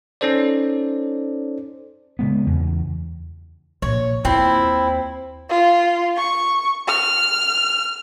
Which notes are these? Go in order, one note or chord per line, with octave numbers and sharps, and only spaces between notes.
C#4 D#4 A4 C5 D5
C#3 G#3 B3
E2 C#3
A#1 C#5
D#2 C4 E4 F4
F4
C#6
F6